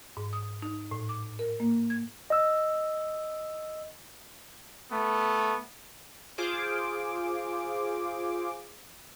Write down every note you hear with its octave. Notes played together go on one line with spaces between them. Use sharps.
G#2
D#6
D#4
A2
D6
A#4
A#3
G#6
D#5 E6
A3 B3
F4 G#4 C5 D6